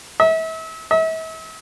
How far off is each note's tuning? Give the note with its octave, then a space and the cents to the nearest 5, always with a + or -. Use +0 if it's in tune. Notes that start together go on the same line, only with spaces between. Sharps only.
E5 -35
E5 -40